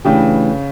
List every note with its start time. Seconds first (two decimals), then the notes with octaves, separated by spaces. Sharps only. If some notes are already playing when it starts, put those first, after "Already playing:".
0.05 C#3 E3 A3 D4 G4